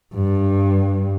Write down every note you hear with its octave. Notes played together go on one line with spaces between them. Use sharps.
G2